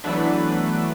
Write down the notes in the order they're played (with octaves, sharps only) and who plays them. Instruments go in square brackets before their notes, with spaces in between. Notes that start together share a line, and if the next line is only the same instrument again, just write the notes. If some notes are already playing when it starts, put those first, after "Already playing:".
[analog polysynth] E3 F#3 A3 B3 D4 B4